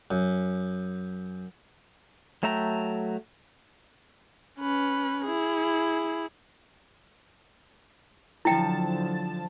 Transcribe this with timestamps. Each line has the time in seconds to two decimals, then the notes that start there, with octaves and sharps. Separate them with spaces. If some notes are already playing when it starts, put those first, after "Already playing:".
0.11 F#2
2.43 F#3 A3 E5 G5 A#5
4.60 C#4 B4
5.25 E4 G#4
8.45 D3 F3 F#3 E4 G5 A5